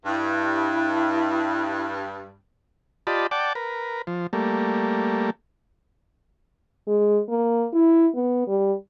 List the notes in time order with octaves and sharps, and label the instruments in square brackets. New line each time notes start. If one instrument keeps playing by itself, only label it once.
[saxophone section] G2 [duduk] E4
[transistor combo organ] F4 G4 D5 D#5 A5 B5
D5 F#5 G5 A5 D6
A#4 B4
F3
G3 A3 A#3
[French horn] G#3
A#3
E4
B3
G3